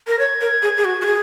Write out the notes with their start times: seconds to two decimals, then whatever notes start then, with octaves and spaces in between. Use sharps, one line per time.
0.07 A#4 A#6
0.19 C#5 G#6
0.41 A#4
0.62 G#4
0.77 G#4
0.85 F#4
1.02 F#4
1.06 G#4